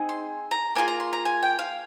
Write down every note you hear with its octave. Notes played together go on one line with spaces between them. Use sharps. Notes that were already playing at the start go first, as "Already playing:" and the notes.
Already playing: C4 D#4 G#4
C6
A#5
A#3 D4 F4 G#4 G#5
A#5
C6
A#5
G#5
G5
F5